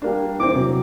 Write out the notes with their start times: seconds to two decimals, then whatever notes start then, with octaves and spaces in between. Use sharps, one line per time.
0.02 G3 A#3 D4
0.40 E2 C4 D6
0.56 C3 F#3